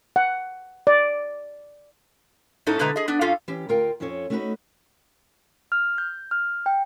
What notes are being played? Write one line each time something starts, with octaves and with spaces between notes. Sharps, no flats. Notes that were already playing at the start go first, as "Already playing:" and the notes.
F#5
D5
G#2 C#4 D#4 E4 A4
B2 D3 G#3 A3 B4 A#5
G#4 D#5
B3 D4
F#2 C#4 F4 A4 F5
E3 C#4 G4
D2 F4 A#4 F5 G5
F2 C#4 F4 A4 C#5
A3 C#4 D#4 F#4 G#4 B4
F6
G6
F6
G5